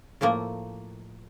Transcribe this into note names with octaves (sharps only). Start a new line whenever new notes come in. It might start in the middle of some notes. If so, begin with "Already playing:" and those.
A2 F3 A3 A#3